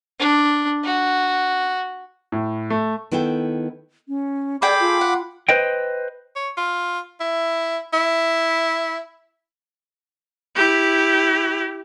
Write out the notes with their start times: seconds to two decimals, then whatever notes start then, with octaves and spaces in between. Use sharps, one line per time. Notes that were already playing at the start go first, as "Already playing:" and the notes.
0.19 D4
0.84 F#4
2.32 A2
2.70 A3
3.12 D#3 B3 E4 A4 G5
4.09 C#4
4.62 G#4 A4 D5 G5 B5 D6
4.80 F4
5.01 F#5
5.49 B4 C5 D#5 G5
6.36 C#5
6.57 F4
7.20 E4
7.93 E4
10.56 E4 G4